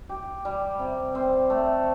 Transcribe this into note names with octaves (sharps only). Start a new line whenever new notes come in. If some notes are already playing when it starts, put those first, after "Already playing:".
G4
G3
C3
C4
A3